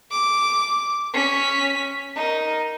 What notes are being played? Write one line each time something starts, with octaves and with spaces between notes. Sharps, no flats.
D6
C#4 B6
D#4 A#4